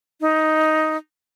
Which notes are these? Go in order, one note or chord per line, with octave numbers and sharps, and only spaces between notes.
D#4